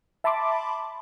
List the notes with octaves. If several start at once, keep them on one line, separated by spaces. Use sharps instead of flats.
E5 A5 B5 C6 D6